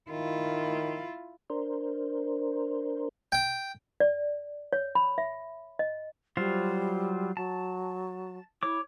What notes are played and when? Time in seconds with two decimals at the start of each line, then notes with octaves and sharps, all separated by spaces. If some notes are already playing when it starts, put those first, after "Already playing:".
0.10 D#3 E4 F4
1.50 D4 A#4 C5
3.32 G5
4.00 D5
4.73 C#5
4.95 B5
5.18 E5
5.79 D#5
6.37 F#3 G3 F4 C5
7.37 F#3 A5
8.63 E4 C#5 D6